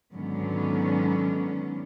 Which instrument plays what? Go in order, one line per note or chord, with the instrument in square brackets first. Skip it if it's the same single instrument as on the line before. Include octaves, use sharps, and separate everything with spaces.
[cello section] G#2 D3 D#3 F#3 B3 C#4